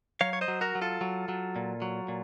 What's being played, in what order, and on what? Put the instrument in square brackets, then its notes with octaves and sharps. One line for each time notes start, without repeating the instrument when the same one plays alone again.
[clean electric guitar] F#3 C#5 F5
C#5
C5 D#5
F#3
F#4 A#4
F#3
F4 A4
F#3
F#3
A#2
F#3
A#2